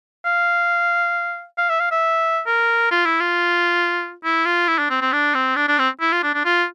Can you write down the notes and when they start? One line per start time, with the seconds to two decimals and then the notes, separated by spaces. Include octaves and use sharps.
0.25 F5
1.58 F5
1.69 E5
1.80 F5
1.91 E5
2.46 A#4
2.91 F4
3.06 E4
3.20 F4
4.24 E4
4.46 F4
4.68 E4
4.79 D4
4.90 C4
5.01 C4
5.13 D4
5.35 C4
5.56 D4
5.68 D4
5.79 C4
6.00 E4
6.12 F4
6.23 D4
6.34 D4
6.45 F4